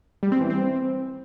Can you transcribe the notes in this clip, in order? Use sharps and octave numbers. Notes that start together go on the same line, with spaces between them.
G3
C4
E3
C4